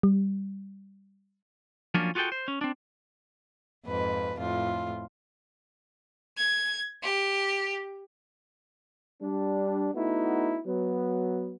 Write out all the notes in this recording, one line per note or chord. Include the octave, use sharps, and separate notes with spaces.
G3
F3 F#3 A#3 C#4 D4 F4
F4 F#4 G#4 A4 G5
C5
C#4
C4 D4
F2 G#2 B4
F2 A2 F4
G#6
G4
G3 D4
A3 B3 D#4 E4 F#4
F#3 B3